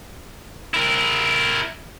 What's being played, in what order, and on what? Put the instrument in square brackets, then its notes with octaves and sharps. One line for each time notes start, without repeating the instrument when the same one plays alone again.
[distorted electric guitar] E4 A#4